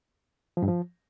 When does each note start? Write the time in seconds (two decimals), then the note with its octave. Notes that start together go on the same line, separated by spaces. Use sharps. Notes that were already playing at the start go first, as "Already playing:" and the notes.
0.57 F3
0.62 G2
0.68 F3